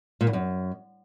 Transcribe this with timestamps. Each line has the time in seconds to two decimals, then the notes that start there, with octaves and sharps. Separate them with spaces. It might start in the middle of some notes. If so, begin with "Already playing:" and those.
0.21 A#2
0.27 E2
0.33 F#2